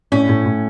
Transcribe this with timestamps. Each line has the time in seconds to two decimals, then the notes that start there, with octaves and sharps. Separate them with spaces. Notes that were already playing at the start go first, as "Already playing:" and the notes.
0.12 A2 C#4
0.29 A2
0.46 A2